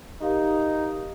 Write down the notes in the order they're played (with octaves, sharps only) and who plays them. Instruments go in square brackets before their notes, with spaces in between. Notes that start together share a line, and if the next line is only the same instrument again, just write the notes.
[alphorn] D#4 [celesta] G4 A#4 F5